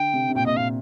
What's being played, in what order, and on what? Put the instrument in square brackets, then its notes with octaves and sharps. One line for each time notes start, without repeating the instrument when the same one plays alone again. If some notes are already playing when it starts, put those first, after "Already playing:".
Already playing: [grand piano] D3 [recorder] G5
[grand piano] C3
C3
[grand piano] A#2 [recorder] G5
[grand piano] A#2 [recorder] D#5
[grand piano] A#2 [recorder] F5